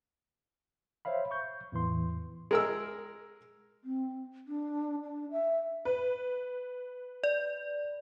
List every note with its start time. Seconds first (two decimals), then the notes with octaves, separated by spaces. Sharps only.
1.05 C5 C#5 E5 F5 B5
1.31 C#6 G6
1.72 E2 A2 E3 C6
2.51 G#3 A#4 E6
3.84 C4
4.48 D4
5.04 D4
5.31 E5
5.85 B4
7.23 D5